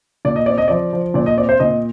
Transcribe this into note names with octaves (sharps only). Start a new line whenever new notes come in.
A#2 D5
D#5
C4 D5
D#5
F3 D5
F3
A#2 D5
D#5
C4 D5
C5
A#2 D#5